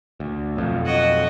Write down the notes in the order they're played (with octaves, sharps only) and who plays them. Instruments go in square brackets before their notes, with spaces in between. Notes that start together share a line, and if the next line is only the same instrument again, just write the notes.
[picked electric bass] D2
B1 F2
[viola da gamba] F#4 D#5